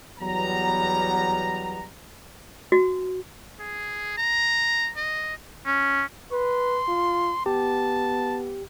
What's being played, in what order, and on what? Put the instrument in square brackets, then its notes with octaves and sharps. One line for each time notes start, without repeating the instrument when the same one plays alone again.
[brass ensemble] E2 F#3 G3 B3 A#5
[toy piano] F#4
[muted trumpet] G#4
A#5
D#5
[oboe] C#4
[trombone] B4 [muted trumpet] C6
[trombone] F4
[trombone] B3 [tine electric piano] G4 [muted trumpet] A5